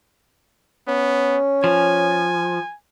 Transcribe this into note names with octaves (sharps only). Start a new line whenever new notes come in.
B3 C#4
F3 G#5